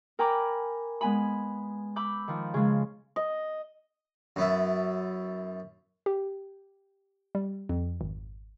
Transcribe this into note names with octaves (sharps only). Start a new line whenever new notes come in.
A#4 G5 G#5 A#5 B5 D6
G#3 B3 G#5 B5
B5 D6 E6 G6
D#3 F3
C#3 G#3
D#5
F#2 B3 E4
G4
G3
F2
G#1